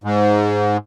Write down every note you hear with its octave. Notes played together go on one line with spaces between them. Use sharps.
G#2